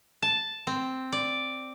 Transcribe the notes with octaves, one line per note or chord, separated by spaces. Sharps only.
A5
C4
D5